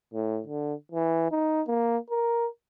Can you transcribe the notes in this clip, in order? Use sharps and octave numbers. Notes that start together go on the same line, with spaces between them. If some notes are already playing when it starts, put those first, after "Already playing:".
A2
D3
E3
D#4
A#3
A#4